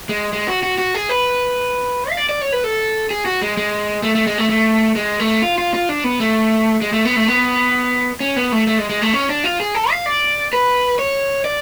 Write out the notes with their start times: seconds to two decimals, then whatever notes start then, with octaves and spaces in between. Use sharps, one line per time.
0.09 G#3
0.33 G#3
0.48 F#4
0.63 F#4
0.78 F#4
0.94 G#4
1.09 B4
2.10 F5
2.17 D5
2.29 D5
2.41 C#5
2.52 B4
2.64 A4
3.11 G#4
3.26 F#4
3.42 G#3
3.57 G#3
4.03 A3
4.15 A3
4.27 G#3
4.38 A3
4.50 A3
4.96 G#3
5.20 A3
5.42 F4
5.58 F4
5.74 F4
5.89 D4
6.04 B3
6.20 A3
6.82 G#3
6.93 A3
7.05 B3
7.16 A3
7.28 B3
8.20 C#4
8.36 B3
8.52 A3
8.67 A3
8.78 G#3
8.90 G#3
9.02 A3
9.13 C#4
9.29 D4
9.44 F4
9.60 G#4
9.75 A4
9.91 F5
10.06 D5
10.53 B4
10.99 C#5
11.45 D5